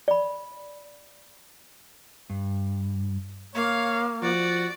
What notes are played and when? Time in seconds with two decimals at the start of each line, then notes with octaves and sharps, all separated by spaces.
0.08 D5 B5
2.30 G2
3.55 A#3 C#5 F5
4.22 F3 F#4 D5